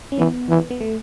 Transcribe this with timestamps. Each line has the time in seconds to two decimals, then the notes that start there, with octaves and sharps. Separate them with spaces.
0.12 C#4
0.18 E3 B3
0.49 E3
0.71 B3
0.81 A3